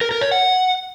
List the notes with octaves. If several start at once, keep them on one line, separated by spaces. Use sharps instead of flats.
A#4
A#4
C#5
F#5